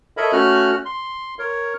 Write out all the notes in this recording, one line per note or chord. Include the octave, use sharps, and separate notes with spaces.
A4 A#4 C#5 D#5 E5 B5
A3 C#4 F#4 F6 F#6
C6
A#4 C#5